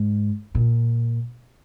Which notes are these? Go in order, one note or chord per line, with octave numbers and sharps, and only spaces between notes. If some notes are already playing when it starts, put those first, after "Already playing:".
Already playing: G#2
A#2